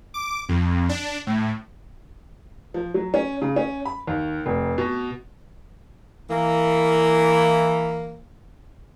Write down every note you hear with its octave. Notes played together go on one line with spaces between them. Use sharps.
D6
F2
D4
A2
F3
F#3
C#4
C#3
C#4
B5
D#2
F1
B2
E3 A#3